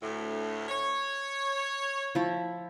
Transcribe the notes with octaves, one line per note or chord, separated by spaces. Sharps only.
D2 A2
C#5
F3 E4